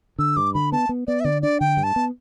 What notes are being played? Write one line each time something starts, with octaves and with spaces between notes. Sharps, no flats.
D3 E6
G2 D6
D3 B5
B3 A5
B3
B3 D5
E5
D3 D5
D4 D5
D3 G5
G2
A5
B3